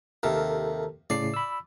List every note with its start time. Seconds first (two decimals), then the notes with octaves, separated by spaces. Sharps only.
0.23 D#2 C3 A4 A#4
1.10 A2 C#3 D5 C7
1.34 B5 E6